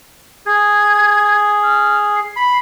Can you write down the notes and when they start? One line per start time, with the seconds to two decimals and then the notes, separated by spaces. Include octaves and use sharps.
0.46 G#4 G#6
1.63 F6
2.16 C7
2.36 B5